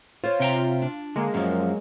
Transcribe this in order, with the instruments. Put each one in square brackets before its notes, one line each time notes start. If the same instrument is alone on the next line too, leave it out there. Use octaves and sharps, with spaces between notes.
[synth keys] F4 [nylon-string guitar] C5 C#5
[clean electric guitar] C3 G5 A#5
[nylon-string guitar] D4
[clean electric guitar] D3 [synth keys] G#3 A#3
[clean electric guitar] F#2 F3 [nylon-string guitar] F#3